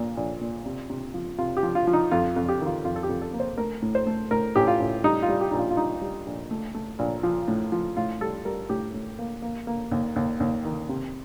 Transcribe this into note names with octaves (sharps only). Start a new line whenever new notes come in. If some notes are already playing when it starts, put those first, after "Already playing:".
Already playing: A#1 A#2
A#1
A#2
C3
C3
F3
C3 F4
G4
F3
F4
F3
D#4
F2 F4
F2
G4
D#3
F4
F2 F4
A4
G4
F2
A4
A#3
C5
A3 A#4
A2
C5
A3
A2 A#4
A1 G4
F4
A1
G3 D#4
F4
G3
G4
A#1 D#4
F4
F4
G3 D#4
G3
A#1
A3
A3
A#1
F3
A2
F3
A2 F4
G3 A4
G3 A#4
A2 G4
A2
A#3
A#3
A#3
D#2
D#2
D#2
D#3
C3